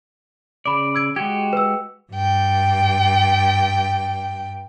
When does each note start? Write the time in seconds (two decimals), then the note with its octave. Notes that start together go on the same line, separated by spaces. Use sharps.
0.65 C#3 D5 B5 D6
0.95 E6 G#6 D7
1.16 G#3 F#4 G4 G#6 G7
1.53 B4 E6
2.13 G2 G5